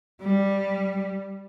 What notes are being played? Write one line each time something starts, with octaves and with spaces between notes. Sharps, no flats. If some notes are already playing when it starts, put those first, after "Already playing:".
G3